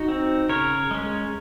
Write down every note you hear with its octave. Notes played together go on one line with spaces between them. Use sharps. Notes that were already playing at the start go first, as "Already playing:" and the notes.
Already playing: D#4 F#4
C4
C#3 A#4 C#5
G#3 C#4